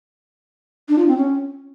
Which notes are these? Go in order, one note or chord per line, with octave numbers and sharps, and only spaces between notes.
D4
F4
C4
C#4